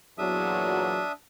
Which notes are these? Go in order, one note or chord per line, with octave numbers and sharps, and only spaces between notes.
E2 A#2 F#3 D4 E5 D#6